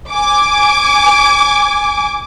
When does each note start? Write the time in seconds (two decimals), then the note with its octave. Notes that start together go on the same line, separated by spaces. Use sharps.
0.11 G#5 D6